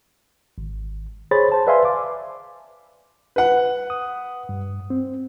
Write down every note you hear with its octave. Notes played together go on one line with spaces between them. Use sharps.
G#1
G#4 C5 C#5 B5 A6
C5 A5
B4 D5 E5 F5 G#5 C6
D6
B4 F#5
D#6
G2
C4